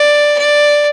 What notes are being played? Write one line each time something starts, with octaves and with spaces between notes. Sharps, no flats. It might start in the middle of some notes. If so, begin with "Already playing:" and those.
Already playing: D5
D5